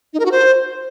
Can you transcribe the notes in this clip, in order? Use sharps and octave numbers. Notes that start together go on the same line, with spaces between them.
D#4
A#4
F#4
C5